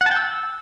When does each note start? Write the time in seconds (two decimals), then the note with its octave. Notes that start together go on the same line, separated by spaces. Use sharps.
0.01 F#5
0.06 A5
0.11 G5
0.16 E6